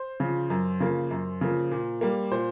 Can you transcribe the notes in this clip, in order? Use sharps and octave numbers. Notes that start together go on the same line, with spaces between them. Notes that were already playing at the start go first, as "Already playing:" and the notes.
Already playing: C5
C#3 F3
F#2
C#3 F3 A#3
F#2
C#3 F3 A#3
A#2
G3 A#3
A#2 C5